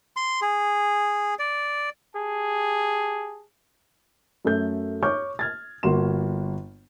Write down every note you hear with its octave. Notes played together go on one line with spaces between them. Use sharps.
C6
G#4
D5
G4 G#4 A5
F#2 A3 A4 G6
C#5 C#6 D6 F6 G6
F6 G#6 A6
G1 A#3 F#4 C6 E7